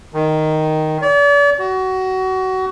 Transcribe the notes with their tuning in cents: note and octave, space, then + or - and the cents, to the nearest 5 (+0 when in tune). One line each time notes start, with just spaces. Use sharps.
D#3 +0
D5 -40
F#4 +25